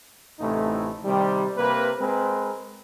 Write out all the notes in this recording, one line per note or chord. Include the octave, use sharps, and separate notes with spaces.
A1 C3 A3 D#4 E4
C3 D#3 G3
C3 A#3 A#4 B4
G#3 C4 A#4 B4